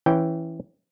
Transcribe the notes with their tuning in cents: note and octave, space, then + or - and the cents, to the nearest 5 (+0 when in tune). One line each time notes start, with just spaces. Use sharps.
E3 +0 C#4 -10 G5 +0